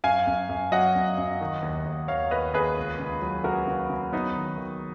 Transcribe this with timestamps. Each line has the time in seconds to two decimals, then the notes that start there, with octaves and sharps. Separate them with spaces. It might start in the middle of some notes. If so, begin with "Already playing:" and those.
0.04 F#2 F5 G#5
0.27 F#2
0.49 F#2
0.72 F#3 D#5 F#5
0.95 F#2
1.18 F#2
1.41 D#3
1.63 D#2
1.85 D#2
2.08 D#2 C#5 F5
2.31 D#2 B4 D#5
2.53 D#2 G#4 B4
2.77 C#2
2.99 C#2
3.22 F#3
3.44 C#3 F#4 A#4
3.67 C#3
3.90 C#3
4.13 F#3 B3 D#4
4.36 D#3
4.58 D#3